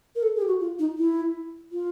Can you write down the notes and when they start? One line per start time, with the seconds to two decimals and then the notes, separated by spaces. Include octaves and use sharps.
0.15 A#4
0.23 A4
0.36 G#4
0.42 G4
0.47 F#4
0.60 F4
0.79 D#4
0.98 E4
1.72 F4